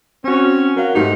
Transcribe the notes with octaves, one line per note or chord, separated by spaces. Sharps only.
C4 C#4 F#4
F#3 A#4 F5
G#2 A3 D#4 G4